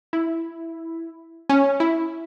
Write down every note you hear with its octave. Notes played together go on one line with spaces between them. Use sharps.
E4
C#4
E4